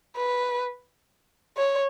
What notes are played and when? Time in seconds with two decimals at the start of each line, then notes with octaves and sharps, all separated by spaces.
0.16 B4
1.58 C#5